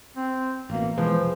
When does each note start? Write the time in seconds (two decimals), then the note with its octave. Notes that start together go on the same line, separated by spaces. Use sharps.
0.17 C4
0.70 A1 B2 A#3
0.98 B2 E3 F3 G#3 G#4 B4 C5
1.18 F1